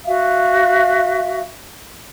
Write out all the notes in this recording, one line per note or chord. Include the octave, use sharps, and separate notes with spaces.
F#4 E5 F5